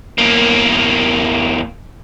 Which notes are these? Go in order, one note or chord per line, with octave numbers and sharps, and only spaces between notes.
E2 A#3